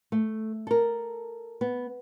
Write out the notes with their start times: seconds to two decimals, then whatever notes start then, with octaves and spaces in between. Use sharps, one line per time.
0.12 A3
0.67 A4 A#4
1.61 B3